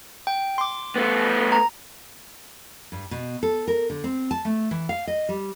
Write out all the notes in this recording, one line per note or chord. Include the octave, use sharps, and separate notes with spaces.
G5
C6 D6
A3 B3
A#5
G2
B2
A4
A#4
D3
C4
A5
A3
E3
F5
D#5
G3